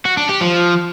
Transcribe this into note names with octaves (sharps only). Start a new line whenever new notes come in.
F#4
D4
G4
F3